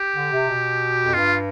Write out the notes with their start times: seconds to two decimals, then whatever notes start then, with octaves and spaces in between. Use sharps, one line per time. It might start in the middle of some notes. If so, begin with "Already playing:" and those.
Already playing: G4
0.15 D3
0.31 C3
0.48 B2
1.05 F2
1.14 G2 F4